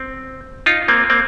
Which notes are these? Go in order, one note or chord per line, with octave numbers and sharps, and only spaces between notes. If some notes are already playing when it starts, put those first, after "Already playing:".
Already playing: C4
D#4 F4
A#3 C4
A#3 C4